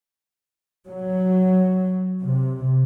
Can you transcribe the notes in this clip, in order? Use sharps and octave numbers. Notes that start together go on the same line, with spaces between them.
F#3
C3